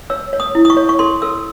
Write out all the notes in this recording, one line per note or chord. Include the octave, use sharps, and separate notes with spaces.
C#5 E6
C#5
D#6
E4
D#6
C#6
C#5
C#6
A4 C6
A4 E6